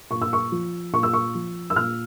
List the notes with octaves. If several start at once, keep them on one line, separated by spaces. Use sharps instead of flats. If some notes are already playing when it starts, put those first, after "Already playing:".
A#2 C#6
E6
C#6
F3
A#2 C#6
E6
C#6
F3
E6
A#2 F6